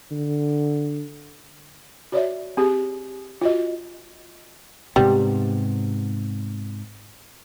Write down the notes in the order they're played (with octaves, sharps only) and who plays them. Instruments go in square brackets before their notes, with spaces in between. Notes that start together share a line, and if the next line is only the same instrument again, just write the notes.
[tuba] D3
[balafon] F#4 C#5 D5 E5
C4 G4 G#4
F4 F#4 D#5
[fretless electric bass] G#2 C3 B3 [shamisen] G3